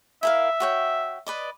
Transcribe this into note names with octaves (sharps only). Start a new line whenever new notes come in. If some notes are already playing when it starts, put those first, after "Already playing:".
E4 A#4 E5 F5
F#4 C#5 G5
B4 D5 D#5